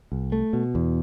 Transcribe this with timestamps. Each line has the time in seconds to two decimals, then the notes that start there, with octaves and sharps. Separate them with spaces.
0.12 C2
0.32 A3
0.53 B2
0.75 E2